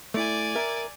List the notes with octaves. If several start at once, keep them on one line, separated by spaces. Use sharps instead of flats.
A3 E4 D5 G#5
A#4 E5